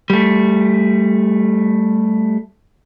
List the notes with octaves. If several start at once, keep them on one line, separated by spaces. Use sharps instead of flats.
G3 A3